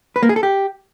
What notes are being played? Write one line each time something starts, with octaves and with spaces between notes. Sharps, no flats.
B4
A#3
G#4
A4
G4